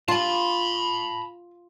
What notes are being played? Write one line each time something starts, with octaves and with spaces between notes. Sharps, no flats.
F4 A5 B5